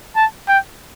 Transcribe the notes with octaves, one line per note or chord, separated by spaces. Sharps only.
A5
G5